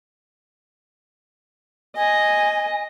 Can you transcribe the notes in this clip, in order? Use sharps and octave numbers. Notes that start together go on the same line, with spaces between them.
D#5 G#5